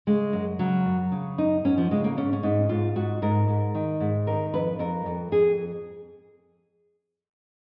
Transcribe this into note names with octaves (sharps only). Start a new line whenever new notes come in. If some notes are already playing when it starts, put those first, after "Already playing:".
C#3 G#3
F#2
C#3 F#3
F#2
C#3
F#2 D#4
F#2 C#4
F3
C#3 G#3
A#3
G#2 C#4
C#4
G#2 D#4
G#2 F4
G#2 F#4
G#2 A#4
G#2
D#3
G#2
D#3 A#4
F2 B4
F2 A#4
F2
F2 G#4